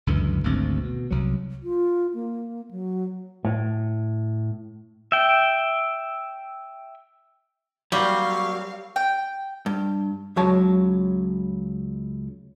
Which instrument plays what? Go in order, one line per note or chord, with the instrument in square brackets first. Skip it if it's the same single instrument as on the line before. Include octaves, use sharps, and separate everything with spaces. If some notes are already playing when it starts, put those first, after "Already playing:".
[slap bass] C#2 F#2 D3 E3
G#1 D2 C4
B2
C2 F#3
[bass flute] F4
A#3
F#3
[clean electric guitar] A2
[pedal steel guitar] E5 G5
[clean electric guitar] F#3 A#3 C4 [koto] G3 [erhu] F5 [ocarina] C#6
[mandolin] G5
[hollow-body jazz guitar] G2
C#2 C#3 F#3 C#5 A5